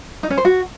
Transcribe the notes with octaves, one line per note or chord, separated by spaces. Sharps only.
D#4
C#4
C5
F#4